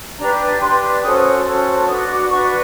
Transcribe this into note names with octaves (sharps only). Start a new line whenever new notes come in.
D4 G4 B4 A#5
D4 G4 B4 C6
C#4 F#4 A4 C5 D#6
C#4 F#4 A4 C5
D4 F#4 B4 D#6
D6
D4 F#4 B4 C#6